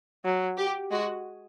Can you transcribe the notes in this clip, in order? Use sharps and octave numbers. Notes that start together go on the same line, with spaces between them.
F#3
G4
G#3 F#4